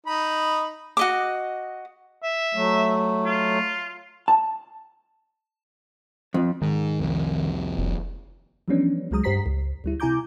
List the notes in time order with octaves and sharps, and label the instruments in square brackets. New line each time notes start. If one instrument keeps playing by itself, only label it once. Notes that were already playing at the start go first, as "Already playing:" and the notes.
[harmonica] D#4 B5
[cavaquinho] F#4 D#5 D6
[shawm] E5
[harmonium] F#3 A3
[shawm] F4
[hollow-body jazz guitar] A5
F2
[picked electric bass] G#2 [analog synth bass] D#3
[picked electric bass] C2 F2
[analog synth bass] F1
[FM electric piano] E3 F3 G3 B3 C#4 D4
C#2 F#3 G#3 A#5 D#6
G2 G4 C5 A#5 B6 C7
C#2
D2 G3 E4
C3 E4 G#5 A#5 D6 G6